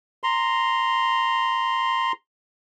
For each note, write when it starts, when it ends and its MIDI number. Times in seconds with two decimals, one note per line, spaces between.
0.24 2.12 82
0.24 2.12 84